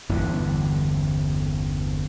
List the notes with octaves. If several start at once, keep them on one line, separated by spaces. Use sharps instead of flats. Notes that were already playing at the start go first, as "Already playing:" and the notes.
G1 E2 A2 D3